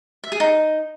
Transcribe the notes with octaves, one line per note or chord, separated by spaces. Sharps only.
E5
G#4
D#4